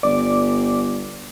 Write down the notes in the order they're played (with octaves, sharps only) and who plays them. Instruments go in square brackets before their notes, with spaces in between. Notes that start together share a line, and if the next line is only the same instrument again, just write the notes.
[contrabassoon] G1 [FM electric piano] D5 D6